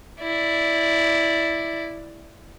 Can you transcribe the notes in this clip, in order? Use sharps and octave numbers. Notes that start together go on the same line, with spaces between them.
E4 D5